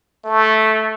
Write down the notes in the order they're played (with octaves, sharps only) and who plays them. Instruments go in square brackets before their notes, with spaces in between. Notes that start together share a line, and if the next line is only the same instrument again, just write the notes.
[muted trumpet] A3